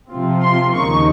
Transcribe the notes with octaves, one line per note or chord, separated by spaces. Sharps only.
C3 F3 C4 F4
C6
D#2 C#3 F3 A#3 D#4 C#6